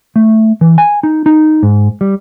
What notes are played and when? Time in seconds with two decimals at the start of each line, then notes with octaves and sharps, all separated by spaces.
0.16 A3
0.61 E3
0.78 G#5
1.03 D#4
1.26 D#4
1.63 G#2
2.01 G3